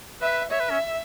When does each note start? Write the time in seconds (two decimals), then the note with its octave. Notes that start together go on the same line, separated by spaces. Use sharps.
0.22 B4 E5
0.51 C#5 E5
0.60 B4
0.70 C#4